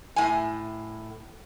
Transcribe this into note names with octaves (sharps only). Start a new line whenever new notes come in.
A2 G#5